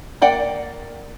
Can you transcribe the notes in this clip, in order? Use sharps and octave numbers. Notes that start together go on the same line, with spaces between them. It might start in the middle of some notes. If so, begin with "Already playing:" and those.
A#3 D5 F#5 G5